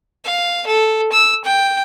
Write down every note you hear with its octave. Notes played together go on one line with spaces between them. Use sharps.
F5
A4
E6
G5